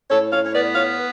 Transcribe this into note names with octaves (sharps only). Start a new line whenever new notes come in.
A2 A4 C#5
C#5 F5
C#5
B3 B4 D5
C#5 F5
B4